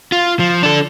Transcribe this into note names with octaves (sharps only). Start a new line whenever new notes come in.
F4
F3
D4 A4